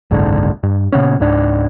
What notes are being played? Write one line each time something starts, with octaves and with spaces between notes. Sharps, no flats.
F#1 C2 G#2 D3
G2
A#2 C#3 B3 C#4
C#2 G#2 D4